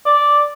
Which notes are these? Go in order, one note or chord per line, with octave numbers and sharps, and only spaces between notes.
D5